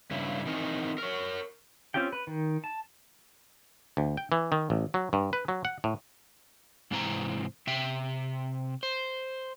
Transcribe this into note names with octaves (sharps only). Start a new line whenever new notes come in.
G2 C#3 E4
E3 C4 D#4 A#4
A#4 C#5
C4 C#4 F4 G4 G5
B4
D#3
A5
D2
G5
E3
D#3
A1
F#3
G2
B4
F#3
F#5
A2
G#2 C3 E3 C4 A5 A#5
C3 C4 E5 G5
C5